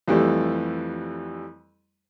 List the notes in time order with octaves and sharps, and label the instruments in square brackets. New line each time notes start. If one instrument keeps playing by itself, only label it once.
[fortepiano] F2 E3 G3 A3